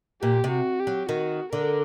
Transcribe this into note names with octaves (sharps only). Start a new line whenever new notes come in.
A#2 G4
C3
F#4
G4
F#3
D#3 F#4
D3 A#4